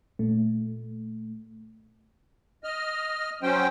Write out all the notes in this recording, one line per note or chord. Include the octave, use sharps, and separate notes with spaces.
A#2 A3
D#5 F6
F#3 C#4 C5 G5